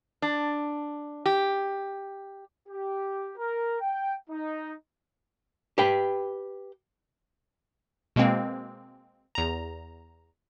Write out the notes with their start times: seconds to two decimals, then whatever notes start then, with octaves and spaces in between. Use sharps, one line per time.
0.22 D4
1.26 G4
2.69 G4
3.38 A#4
3.81 G5
4.30 D#4
5.78 G4 B4 G5
8.16 B2 G#3 A#3 C4
9.35 E2 A#5